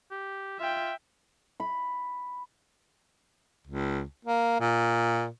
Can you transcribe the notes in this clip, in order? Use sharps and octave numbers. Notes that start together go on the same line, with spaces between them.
G4
F4 E5 G5
B5
C#2
A#3
A#2